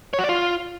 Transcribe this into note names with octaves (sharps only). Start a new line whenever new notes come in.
C#5
F#4
D5
F4